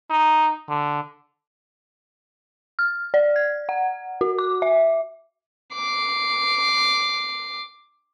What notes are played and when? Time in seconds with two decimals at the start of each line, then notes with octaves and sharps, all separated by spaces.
0.10 D#4
0.69 D3
2.79 F6
3.14 D5
3.36 G#6
3.69 F#5
4.21 F#4
4.39 D6
4.62 E5
5.74 D6 C7